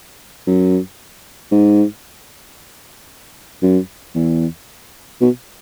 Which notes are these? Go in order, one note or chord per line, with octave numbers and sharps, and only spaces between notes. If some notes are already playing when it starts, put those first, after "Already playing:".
F#2
G#2
F#2
E2
B2